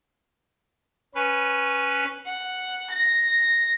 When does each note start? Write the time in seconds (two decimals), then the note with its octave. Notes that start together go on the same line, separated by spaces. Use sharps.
1.15 C#4 B4
2.26 F#5
2.91 A#6